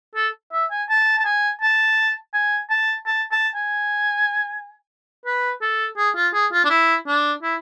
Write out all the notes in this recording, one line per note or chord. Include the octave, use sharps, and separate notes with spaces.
A4
E5
G#5
A5
A5
G#5
A5
G#5
A5
A5
A5
G#5
B4
A4
G#4
F4
G#4
F4
D4
E4
D4
E4